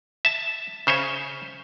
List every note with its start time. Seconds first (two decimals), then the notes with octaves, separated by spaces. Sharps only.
0.25 E5 A5
0.87 C#3 C5 C#5 E5